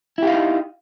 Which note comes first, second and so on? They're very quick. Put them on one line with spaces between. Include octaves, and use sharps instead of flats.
E4 G4 F5 D#4